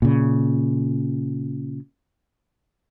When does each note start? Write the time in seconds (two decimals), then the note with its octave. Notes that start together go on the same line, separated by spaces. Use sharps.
0.02 A#2 C#3